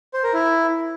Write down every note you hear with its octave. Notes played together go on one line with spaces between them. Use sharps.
C5
A#4
E4